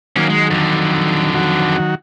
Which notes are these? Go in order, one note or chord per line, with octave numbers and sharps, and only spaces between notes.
D#3 F#3 A#3 C#4
G#3
F2 D3
D#3 F#3 F#4